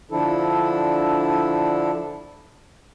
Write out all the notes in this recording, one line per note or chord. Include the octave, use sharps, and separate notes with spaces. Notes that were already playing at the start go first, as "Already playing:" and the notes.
D3 F3 D4 E4 A4